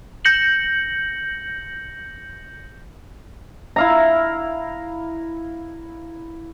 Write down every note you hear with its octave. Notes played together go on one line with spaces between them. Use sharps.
G6 A#6 C#7 F#7
E4 F5 A#5